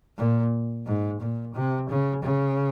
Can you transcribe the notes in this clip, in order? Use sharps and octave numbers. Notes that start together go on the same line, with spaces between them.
A#2
G#2
A#2
C3
C#3
C#3